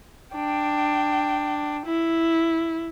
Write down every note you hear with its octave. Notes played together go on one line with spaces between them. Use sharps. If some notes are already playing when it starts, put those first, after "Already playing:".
D4 G5
E4